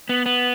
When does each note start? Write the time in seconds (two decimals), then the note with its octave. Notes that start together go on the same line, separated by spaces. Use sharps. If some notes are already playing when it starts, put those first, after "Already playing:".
0.09 B3
0.26 B3